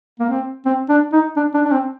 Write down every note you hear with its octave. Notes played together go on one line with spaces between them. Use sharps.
A#3
C4
C4
D4
D#4
D4
D4
D4
C4